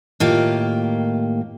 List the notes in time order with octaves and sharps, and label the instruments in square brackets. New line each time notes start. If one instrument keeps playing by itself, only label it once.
[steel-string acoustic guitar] A2 D#3 A#3 F4 G4